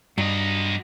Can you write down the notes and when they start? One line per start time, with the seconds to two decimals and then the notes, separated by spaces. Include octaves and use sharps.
0.18 G2 F#3 D#5